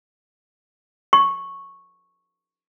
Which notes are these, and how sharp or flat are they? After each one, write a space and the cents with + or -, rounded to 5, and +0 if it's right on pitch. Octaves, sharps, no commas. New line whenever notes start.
C#6 -10